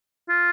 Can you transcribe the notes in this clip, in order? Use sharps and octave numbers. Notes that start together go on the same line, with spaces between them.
F4